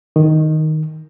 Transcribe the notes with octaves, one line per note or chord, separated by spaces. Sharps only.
D#3